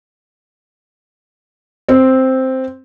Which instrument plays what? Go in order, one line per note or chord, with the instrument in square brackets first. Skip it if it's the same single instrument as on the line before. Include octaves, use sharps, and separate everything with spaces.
[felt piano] C4